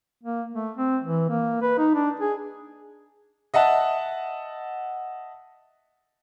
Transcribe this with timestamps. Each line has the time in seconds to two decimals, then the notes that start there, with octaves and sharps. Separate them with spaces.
0.23 A#3
0.54 A3
0.77 C4
1.03 E3
1.30 A#3
1.62 B4
1.78 D#4
1.94 D4
2.20 G#4
3.54 D#5 E5 F#5 A5